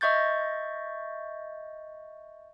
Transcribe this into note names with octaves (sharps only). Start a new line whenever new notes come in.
D#5 E5 C#6 G6 A6